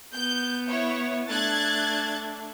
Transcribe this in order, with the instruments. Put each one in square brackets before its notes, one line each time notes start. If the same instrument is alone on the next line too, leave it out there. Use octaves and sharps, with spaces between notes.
[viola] B3 [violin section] G6
[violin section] E4 C#5
[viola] A3 D4 [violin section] F#6 G#6 A6